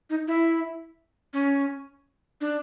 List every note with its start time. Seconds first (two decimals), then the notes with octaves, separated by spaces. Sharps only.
0.10 D#4
0.28 E4
1.33 C#4
2.41 D4